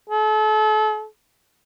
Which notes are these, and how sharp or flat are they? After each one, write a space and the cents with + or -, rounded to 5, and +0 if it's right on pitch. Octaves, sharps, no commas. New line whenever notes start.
A4 -40